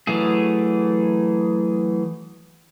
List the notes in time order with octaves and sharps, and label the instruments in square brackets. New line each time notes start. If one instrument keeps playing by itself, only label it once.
[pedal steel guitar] E3 F#3 A3 G#4